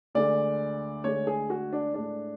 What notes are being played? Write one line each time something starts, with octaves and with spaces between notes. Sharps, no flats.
D2 D3 G#3 D5
D2 D3 G#3 C#5
G#4
F#4
D4
A2 G#3 D4